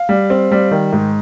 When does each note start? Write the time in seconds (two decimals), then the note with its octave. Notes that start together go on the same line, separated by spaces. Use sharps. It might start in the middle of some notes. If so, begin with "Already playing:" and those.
Already playing: F5
0.09 G3
0.30 C4
0.52 G3
0.71 D#3
0.93 G#2